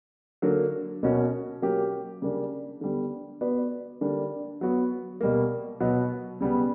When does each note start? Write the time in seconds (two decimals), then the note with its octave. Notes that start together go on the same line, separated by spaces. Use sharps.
0.42 D3 F#3 A#3
1.03 B2 A#3 C#4 F#4
1.62 F#3 A#3 C#4 G4
2.22 C#3 G3 A#3 D4
2.81 D3 G3 B3
3.41 B3 F#4 B4 D5
4.01 D3 G3 A#3 D4
4.61 F#3 B3 F#4
5.21 B2 G3 A#3
5.80 B2 F#3 B3 F#4
6.41 C#3 G3 B3